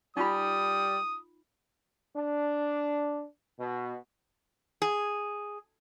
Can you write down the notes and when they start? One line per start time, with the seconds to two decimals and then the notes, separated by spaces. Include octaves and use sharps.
0.17 G3 D#4 F4 B5 D#6
2.16 D4
3.59 B2
4.82 G#4